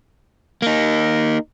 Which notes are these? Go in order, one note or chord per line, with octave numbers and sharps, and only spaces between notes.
A#3 D#4